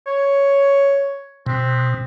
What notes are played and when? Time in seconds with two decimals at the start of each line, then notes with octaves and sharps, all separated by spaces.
0.07 C#5
1.46 B2 C4